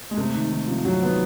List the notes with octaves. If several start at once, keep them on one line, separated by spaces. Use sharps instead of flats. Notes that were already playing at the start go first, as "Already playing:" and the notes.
G#3
C3 A3
D#3
D#3
C3 F3
C3 F#3
D#3 B3